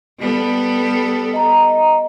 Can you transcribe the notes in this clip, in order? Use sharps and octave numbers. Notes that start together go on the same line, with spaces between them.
G3 B3 A4
D#5 A#5